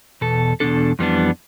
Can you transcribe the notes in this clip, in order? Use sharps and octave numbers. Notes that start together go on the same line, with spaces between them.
E2 B2 A4
E2 B2 G3 D4 A4
F2 E3 G3 B3 D4